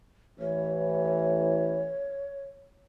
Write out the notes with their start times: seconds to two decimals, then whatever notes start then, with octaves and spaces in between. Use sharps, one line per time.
0.39 A1 E3 C#5